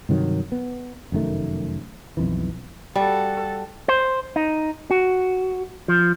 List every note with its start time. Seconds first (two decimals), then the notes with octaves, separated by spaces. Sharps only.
0.09 G2 C3 D#3 F#3
0.52 B3
1.12 F1 F#2 D#3 A3
2.17 B1 F2 E3
2.96 G3 F#4 A4
3.88 C5
4.36 D#4
4.91 F#4
5.88 F3